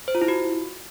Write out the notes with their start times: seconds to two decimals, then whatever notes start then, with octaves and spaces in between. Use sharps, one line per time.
0.08 C5
0.15 F4
0.21 E4
0.28 F#4